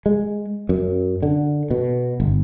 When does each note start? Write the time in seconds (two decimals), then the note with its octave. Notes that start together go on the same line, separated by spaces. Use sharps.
0.06 G#3
0.69 F#2
1.23 D3
1.70 B2
2.20 G1